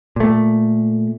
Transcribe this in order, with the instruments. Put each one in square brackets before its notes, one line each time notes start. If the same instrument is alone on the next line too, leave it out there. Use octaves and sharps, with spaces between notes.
[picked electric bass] A#2 A3